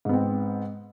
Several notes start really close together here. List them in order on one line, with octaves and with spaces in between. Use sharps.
G#2 B3 C4